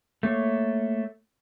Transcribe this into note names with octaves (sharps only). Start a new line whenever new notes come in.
A3 A#3 C#5